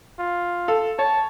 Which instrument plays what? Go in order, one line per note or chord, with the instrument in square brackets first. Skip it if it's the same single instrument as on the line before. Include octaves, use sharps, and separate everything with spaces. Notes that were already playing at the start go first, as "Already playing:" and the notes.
[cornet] F4
[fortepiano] A4 F5
[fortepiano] C#5 [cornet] A5